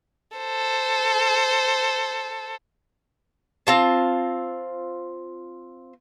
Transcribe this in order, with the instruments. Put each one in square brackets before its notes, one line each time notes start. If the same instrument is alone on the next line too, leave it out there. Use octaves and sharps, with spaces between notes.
[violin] A4 C5
[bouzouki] C4 F4 A5